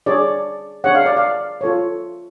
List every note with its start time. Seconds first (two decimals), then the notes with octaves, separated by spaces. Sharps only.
0.06 D4 G#4 C#5 D5
0.84 D4 G#4 C#5 F#5
0.95 F5
1.06 D5
1.17 F5
1.61 F4 A4 C#5